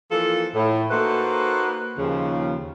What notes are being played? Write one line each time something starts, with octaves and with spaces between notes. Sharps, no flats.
E3 F3 A#3 F4 A4
A2
A#3 D#4 F#4 A4 B4 C5
D#2 C#3 F3